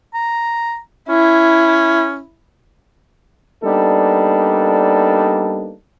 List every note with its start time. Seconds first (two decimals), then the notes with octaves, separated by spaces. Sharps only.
0.14 A#5
1.09 C#4 E4
3.63 G3 A#3 B3 D4 D#4 A4